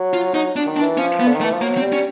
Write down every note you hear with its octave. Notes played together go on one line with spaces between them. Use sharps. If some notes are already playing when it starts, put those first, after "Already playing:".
Already playing: F#3
F4
F#3 D#4
D4
D#3
D4
E3
F3 C#4
B3
D3
D#3
A3
E3
F3
F#3 A#3
C4
G3
C#4